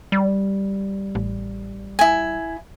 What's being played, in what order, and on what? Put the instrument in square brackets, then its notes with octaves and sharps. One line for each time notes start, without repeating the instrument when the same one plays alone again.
[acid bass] G3
[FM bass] A1
[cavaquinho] E4 G#5